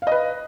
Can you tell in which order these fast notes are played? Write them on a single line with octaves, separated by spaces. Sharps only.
F5 D#5 B4